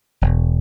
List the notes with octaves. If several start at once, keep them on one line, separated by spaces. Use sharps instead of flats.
E1